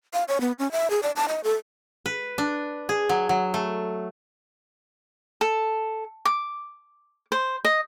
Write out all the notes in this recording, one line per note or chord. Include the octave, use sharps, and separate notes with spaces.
F5
C#5
B3
C#4
E5
G#4
D5
A5
D#5
A4
B4
D4
G#4
F#3
F#3
A3
A4
D6
C5
D#5